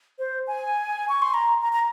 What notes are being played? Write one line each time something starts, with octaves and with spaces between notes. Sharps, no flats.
C5
G#5
C#6
C6
A#5
A#5
A#5